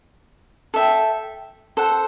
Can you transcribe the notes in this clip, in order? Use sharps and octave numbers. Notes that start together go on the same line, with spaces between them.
A4 E5 G5
A4 C5 F#5